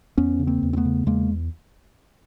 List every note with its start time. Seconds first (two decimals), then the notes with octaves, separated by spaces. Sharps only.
0.18 E2 B3 C#4
0.39 C#3
0.47 A#3 C4
0.63 E2
0.73 C4
0.77 A3 B3
0.85 C#3
1.06 E2 G#3 A#3